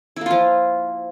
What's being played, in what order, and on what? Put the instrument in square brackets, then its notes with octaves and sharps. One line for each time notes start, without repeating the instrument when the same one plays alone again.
[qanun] E4
A#3
F4
F3